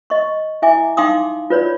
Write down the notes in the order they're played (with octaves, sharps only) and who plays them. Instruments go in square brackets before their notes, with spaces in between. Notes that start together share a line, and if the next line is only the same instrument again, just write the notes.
[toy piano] D#5 C#6
E4 E5 G#5 D6
D#4 F5 G5 C6 D6 D#6
F4 B4 C#5 D5